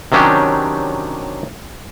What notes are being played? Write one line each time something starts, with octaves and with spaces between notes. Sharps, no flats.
C3 D#3 F#3 C#4 D4 G4